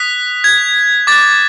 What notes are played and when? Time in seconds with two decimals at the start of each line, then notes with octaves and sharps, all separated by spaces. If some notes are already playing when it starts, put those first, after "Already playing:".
Already playing: D#6 F#6 B6
0.44 G#6
1.07 D6 F#6 A6